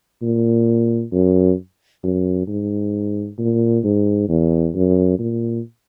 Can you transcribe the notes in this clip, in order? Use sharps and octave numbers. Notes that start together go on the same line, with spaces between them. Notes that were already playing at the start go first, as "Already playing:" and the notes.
A#2
F#2
F#2
G#2
A#2
G#2
E2
F#2
A#2